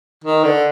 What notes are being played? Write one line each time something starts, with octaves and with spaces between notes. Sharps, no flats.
D#3
D3